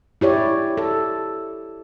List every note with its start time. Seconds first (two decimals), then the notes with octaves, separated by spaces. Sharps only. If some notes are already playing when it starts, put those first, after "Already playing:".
0.21 E4 G4 C#5 D5
0.77 A4